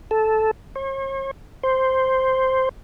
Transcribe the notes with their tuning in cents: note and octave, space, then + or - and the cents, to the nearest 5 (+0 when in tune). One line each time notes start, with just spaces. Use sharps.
A4 -10
C#5 -45
C5 +0